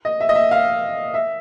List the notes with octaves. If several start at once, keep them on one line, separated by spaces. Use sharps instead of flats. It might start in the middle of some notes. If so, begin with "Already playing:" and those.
D#5
E5
D#5
E5
F5
E5